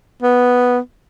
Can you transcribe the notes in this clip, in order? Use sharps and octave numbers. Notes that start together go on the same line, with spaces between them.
B3